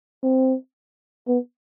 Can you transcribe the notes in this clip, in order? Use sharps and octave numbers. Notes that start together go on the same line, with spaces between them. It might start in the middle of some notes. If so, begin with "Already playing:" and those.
C4
B3